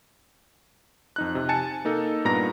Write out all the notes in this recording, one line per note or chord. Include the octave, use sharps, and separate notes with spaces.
F2 D#4 F#6
C3
G#5 A5 A6 C#7
A#3 D#4 A4
G2 A#2 B3 A#5 A#6